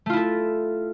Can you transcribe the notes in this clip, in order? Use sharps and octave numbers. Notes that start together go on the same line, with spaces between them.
A3 E4 F4 A4